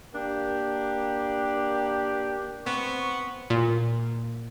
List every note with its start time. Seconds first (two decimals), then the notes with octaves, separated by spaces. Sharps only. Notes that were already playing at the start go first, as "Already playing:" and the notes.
0.14 A#3 D4 G4
2.66 B3 C4 C#6
3.50 A#2